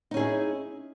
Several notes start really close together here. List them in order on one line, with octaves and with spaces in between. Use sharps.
D#4 C#4 G#4 E4